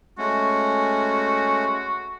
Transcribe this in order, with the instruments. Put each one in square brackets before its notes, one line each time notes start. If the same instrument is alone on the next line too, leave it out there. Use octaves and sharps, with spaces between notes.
[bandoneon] G#3 A3 C#4 [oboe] F#4